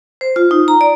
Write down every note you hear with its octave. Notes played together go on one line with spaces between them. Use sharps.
C5
F4
D#4
A#5
D5